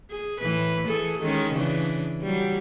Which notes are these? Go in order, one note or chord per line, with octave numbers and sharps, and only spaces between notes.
G#4
A2 E3 B4
E3 G#4 A4
D#3 G#3 C#4
C#3 E3 D4
F#3 G3